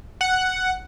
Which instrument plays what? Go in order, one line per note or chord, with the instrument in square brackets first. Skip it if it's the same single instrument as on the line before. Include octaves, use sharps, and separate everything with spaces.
[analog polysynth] F#5